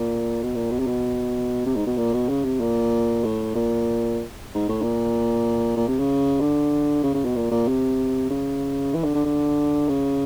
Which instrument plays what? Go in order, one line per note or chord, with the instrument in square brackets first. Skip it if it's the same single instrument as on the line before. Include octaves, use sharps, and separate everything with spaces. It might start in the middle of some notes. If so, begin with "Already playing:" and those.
Already playing: [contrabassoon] A#2
B2
A#2
B2
C3
B2
C3
G#2
B2
A#2
B2
C#3
C3
A#2
A2
A#2
G#2
A2
A#2
A#2
C3
C#3
D3
C#3
C#3
B2
A#2
A#2
C3
C#3
E3
D3
D3
D3
C#3